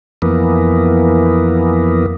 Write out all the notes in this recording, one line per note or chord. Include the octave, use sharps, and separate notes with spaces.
F2 E3 A#3 B3